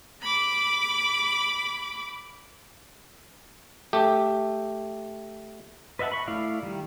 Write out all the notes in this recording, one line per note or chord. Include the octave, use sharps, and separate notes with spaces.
B5 D6
A3 G4
B4 D#5 E5 F#5 A5
B5 C#6
A3 E4 D5 F5
D#3 G3